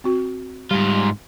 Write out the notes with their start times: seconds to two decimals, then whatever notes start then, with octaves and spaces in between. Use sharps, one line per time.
0.04 C4 F#4
0.71 G#2 G3 F4